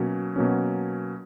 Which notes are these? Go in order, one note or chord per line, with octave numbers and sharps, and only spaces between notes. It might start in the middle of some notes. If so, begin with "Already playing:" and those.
Already playing: B2 F#3 A#3 C#4
B2 F#3 A#3 C#4